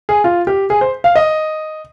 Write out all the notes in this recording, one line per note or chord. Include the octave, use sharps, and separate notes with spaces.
G#4
F4
G4
G#4
C5
F5
D#5